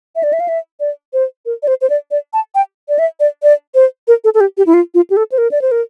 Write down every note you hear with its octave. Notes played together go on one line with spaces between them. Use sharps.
E5
D5
E5
F5
E5
D5
C5
A#4
D5
C5
C5
D5
D5
A5
G5
D5
E5
D5
D5
C5
A#4
A4
A4
G4
G4
E4
F4
F4
G4
A4
C5
A#4
D5
C5
A#4